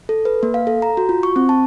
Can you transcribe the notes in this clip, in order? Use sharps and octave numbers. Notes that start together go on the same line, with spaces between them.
A4
B4
A#3
F5
A4
A#5
F#4
F4
C#6
C4
A5